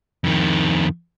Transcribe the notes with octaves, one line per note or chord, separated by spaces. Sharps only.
F2 D#3